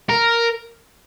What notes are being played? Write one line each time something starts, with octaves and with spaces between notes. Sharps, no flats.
A#4